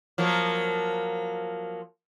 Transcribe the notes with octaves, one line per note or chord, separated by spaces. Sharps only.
F3 F#3 A#3